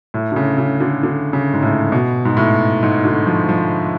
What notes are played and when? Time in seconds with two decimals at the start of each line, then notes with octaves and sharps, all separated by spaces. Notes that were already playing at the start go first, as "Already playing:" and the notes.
0.14 A2
0.32 D3
0.36 C#3
0.58 C#3
0.80 D3
1.03 D3
1.33 C#3
1.53 G#2
1.62 A2
1.92 B2
2.25 G#2
2.37 A2
2.83 G#2
3.05 D3
3.27 F3
3.49 F3